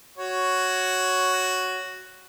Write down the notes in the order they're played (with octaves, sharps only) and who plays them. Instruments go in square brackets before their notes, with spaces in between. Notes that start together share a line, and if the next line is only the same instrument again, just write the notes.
[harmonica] F#4 C#5